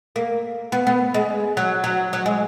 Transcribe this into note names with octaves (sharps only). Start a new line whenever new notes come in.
A#3
B3
B3
G#3
F#3
F#3
F#3
G#3